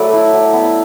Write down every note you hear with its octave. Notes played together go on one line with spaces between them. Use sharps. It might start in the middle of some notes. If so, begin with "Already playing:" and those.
Already playing: F#3 A3 A4 B4 D5
E4
F#3
B3